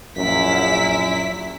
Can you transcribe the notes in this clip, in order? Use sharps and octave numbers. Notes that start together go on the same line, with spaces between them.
A#1 F#2 E4 B6